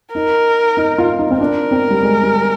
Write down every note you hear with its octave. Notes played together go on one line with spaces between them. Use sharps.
D#4 A#4
D#4
F4
D#4
C4
D4 A#4
C4
G3
G#3
G3